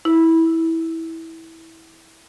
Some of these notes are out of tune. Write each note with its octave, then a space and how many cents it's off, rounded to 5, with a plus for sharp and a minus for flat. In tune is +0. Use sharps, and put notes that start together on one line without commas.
E4 -15